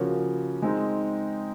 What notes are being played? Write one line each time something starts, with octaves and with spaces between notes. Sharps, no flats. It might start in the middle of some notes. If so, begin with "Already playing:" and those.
Already playing: C#3 F3 A#3 C#4 F#4
G#3 C4 D#4